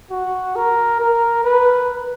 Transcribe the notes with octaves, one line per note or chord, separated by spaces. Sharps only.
F#4
A#4
A#4
B4